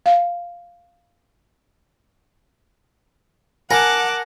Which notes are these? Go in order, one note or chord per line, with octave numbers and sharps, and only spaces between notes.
F5
A#4 F#5 G#5 A5 D6